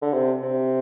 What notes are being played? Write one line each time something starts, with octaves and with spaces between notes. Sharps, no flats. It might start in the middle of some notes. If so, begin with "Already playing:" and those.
D3
C3
C3